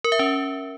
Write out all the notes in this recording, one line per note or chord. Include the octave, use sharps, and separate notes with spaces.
A#4
E5
C#4